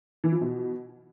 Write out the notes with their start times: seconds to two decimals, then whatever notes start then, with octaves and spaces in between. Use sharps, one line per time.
0.24 E3
0.32 F3
0.41 B2